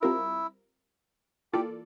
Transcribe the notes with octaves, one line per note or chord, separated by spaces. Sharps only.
G3 C4 E4 F4 A#4
E3 A#3 F4 G4 A4 D5